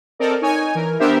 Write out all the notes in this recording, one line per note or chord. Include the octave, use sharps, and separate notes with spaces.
C4 A4 A#4 D5 D#5
D#4 C#5 G#5
E3 A#4
B3 D4 G4 A#4 C5 E5